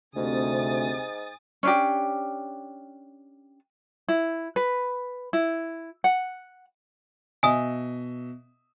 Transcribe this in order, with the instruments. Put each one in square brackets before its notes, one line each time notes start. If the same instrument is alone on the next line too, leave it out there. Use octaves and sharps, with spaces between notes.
[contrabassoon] D2 [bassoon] G#2 [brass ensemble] C3 [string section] G#5 D#6 A6
[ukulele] C#4 D4 G4
E4
B4
E4
F#5
[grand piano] B2 D#5 E5 [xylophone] G#5 D#6